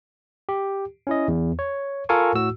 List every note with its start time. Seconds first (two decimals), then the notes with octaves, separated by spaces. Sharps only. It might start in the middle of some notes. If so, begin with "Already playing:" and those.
0.49 G4
1.07 C#4 E4 D#5
1.28 E2
1.59 C#5
2.09 F4 A4 A#4 F5 G#5 C#6
2.35 A2 F#4 E6